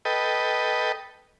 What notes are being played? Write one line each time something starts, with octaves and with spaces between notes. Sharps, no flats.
A4 B4 D#5 G5